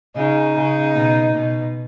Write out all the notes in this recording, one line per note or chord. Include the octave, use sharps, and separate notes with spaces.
C#3 D#4
C#3
B2
B2